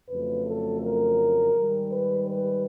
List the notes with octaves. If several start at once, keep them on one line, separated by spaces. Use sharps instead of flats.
F2 C#3 F#3 A3 B4
A4
A#4
G#2 D#3 G3
B4
B4